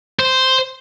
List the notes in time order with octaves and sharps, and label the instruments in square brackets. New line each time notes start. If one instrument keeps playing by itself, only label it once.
[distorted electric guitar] C5